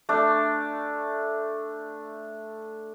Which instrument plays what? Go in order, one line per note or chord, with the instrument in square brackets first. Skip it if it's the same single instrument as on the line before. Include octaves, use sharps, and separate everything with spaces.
[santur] A3 D4